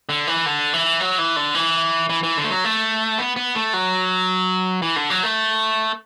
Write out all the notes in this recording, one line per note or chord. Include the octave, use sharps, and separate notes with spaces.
D3
E3
D3
E3
F#3
E3
D3
E3
E3
E3
D3
A3
F#3
A3
B3
B3
A3
F#3
E3
D3
F#3
A3